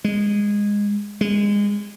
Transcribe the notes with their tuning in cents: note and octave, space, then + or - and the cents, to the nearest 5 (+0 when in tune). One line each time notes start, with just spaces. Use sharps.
G#3 -15
G#3 -25